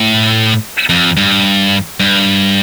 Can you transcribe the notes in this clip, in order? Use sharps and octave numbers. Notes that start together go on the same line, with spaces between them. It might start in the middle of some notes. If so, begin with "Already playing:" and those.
Already playing: A2
F2
G2
G2